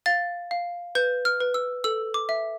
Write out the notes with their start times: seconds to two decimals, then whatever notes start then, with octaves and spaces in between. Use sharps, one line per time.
0.06 F5 A6
0.51 F5
0.95 B4 G6
1.25 F6
1.40 B4
1.54 E6
1.84 A4 E6
2.14 D6
2.29 E5